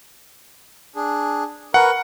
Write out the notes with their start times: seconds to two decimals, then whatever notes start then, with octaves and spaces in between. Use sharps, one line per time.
0.96 D4 G#4
1.74 A#4 B4 F#5 C#6